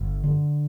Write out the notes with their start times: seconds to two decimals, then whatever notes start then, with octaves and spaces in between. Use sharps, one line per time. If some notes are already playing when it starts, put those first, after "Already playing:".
Already playing: G1
0.24 D3